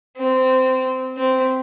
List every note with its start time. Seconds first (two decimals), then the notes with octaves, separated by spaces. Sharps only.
0.17 C4
1.17 C4